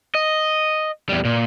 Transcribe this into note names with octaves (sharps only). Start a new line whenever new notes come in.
D#5
E2 G3
A#2